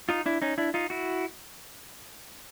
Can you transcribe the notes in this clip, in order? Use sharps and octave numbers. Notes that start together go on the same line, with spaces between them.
D#4 F4
D4 E4
C#4 D#4
D4 E4
D#4 F4
E4 F#4